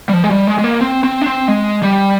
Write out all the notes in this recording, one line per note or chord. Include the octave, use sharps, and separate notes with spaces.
G3
F3
G#3
G3
G#3
G#3
A#3
C4
C4
D4
C4
G#3
G3